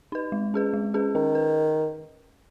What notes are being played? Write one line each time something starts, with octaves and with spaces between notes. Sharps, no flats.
D#4 B4
G#3
C#4 G#4 B4
G#3
C#4 G#4 B4
D#3 C#4
B4